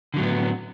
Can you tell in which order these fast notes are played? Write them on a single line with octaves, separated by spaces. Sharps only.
D3 F#3 A2 B3